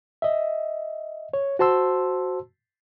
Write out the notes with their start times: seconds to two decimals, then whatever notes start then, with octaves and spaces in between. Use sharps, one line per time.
0.22 D#5 E5
1.34 C#5
1.59 F#4 C5 A5 C6 E6